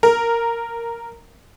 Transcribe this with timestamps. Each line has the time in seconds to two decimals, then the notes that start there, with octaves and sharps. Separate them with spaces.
0.03 A#4